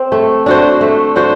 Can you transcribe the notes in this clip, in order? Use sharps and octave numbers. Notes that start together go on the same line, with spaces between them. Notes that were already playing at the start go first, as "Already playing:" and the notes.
Already playing: C4
A3
D4 F#4 C5
A3
D4 F#4 C5